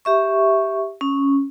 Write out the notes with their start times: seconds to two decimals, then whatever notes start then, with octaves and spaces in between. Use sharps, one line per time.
0.05 G4 E5 C#6
1.01 C#4